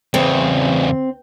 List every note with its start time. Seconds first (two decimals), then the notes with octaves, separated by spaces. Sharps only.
0.14 E2 C#3 C4